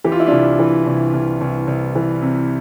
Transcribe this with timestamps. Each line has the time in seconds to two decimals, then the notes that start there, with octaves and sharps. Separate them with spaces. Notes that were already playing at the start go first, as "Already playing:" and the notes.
0.04 E3 G4
0.12 F4
0.20 E4
0.27 C2 D4 F4
0.59 E3
0.86 C2
1.13 C2
1.41 C2
1.67 C2
1.95 E3
2.22 C3